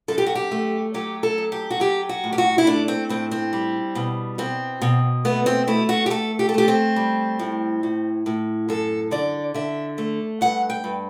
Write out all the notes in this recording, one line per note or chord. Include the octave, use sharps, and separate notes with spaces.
F#2 A4
G4
F#4
G4
A3
F#3 G4
A4
F#2
G4
F#4
F#3 G4
F#4
A2
G4
F#4
E4
A3 D4
C4
A2 C4
C4
G3
B2
B2 C4
B2
A3 B3
C4
A3 E4
F#4
G4
A3 A4
G4
A4
A3 G4
C4
G3
A2
A2
A2
F#2 A4
D3 D5
D3 E5
A3
G2 F#5
G5
G2